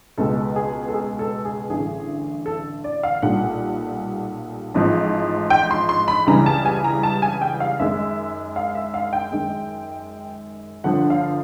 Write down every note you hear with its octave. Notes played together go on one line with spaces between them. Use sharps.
C#2 B2 G#3 A4
G#4
A4
G#4
A4
G#4
A1 G2 D3 G#4
A4
D5
F5
B1 A#2 G3 F#5
A1 G#2 F3
G5
C6
C6
B5
C#2 C#3 E3 G3 A#5
A5
G#5
A#5
A5
G#5
G5
F5
F#2 D#3 G#3 E5
F5
E5
F5
G5
F#2 D#3 G#3
G1 G2 D3 F3 F#5
F5